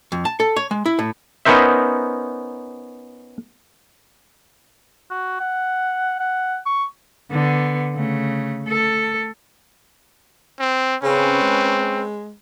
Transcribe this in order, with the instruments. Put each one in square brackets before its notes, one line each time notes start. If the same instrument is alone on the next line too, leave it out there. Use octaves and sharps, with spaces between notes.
[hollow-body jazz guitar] F2
A5
A4
C#5
G#3
E4
A2
[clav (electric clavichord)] B3 C#4 D#4 A#4 C5 E5
[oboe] F#4
F#5
F#5
C#6
[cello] D3 B3
C#3 A3
A3 A4
[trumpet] C4
[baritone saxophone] C#3 [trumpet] C4 [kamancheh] C#4 B4
[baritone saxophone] G#3